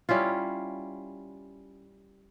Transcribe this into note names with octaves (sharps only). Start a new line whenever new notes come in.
G3 C#4 E4 F4